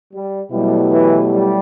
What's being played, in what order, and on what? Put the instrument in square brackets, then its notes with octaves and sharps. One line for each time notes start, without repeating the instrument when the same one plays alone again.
[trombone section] G3
[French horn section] B2 F#3 A3 E4 G4 [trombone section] G3
[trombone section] E3
G3